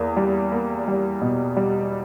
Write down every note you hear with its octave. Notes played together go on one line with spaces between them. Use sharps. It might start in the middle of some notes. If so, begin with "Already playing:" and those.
Already playing: E2 A#3
G3
A#3
G3
B2
G3